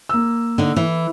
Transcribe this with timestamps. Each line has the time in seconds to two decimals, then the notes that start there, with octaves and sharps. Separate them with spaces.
0.09 A#3 E6
0.58 D3 D#4
0.76 E3